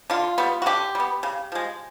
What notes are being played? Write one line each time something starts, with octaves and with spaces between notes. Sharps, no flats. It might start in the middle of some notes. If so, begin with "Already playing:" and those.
D3 F4
G3 B3
F#4
D3 G4
G3
B3
C#3
F3 G#3